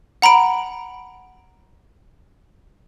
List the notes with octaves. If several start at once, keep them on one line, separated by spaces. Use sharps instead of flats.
F#5 A#5 B5 D7